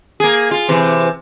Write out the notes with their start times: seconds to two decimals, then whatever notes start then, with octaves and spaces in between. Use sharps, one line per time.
0.20 A#3 G#4
0.51 F4
0.69 C3 E3